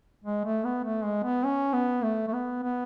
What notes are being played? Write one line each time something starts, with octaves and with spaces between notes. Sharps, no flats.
G#3
A3
B3
A3
G#3
B3
C#4
B3
A3
A3
B3
B3